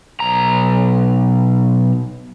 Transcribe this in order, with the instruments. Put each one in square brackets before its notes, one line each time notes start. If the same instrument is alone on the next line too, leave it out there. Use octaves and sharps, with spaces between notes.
[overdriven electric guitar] B1 A#5